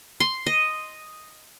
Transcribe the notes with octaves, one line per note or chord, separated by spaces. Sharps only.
C6
D#5